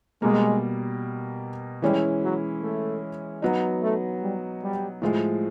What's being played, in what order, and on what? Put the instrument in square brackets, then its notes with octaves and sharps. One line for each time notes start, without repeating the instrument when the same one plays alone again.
[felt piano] B2 G3 A#3 [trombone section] G#3
[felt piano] E3 G#3 C#4 E4 [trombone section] G3
[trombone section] F#3
A3
[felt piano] F#3 B3 D#4
[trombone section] A3
G3
G3
[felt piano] A2 F3 G#3